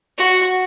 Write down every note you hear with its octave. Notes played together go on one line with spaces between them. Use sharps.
F#4